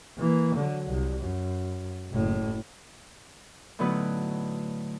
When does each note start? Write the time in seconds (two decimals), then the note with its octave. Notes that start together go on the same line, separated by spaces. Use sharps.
0.19 E3 A#3
0.56 D3 F#3
0.90 C2
1.21 F#2
2.12 F#1 A2
3.79 A2 D3 F#3 B3 D#4 B4